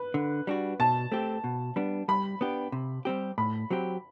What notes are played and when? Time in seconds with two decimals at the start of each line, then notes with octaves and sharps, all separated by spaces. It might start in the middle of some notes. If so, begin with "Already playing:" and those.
Already playing: B4
0.14 D3
0.47 G3 D4 F#4
0.80 B2 A5
1.12 A3 C4 G4
1.44 B2
1.76 G3 B3 D4
2.08 G3 B5
2.41 B3 D4 G4
2.72 C3
3.05 G3 C4 G4
3.38 A2 B5
3.71 F#3 C4 G4